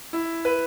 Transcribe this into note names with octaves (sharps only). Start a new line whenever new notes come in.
E4
B4